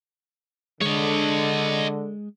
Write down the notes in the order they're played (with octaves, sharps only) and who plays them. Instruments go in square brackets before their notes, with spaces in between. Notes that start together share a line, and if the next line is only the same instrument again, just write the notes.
[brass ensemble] D3 [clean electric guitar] G#3 [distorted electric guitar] C#5 D#5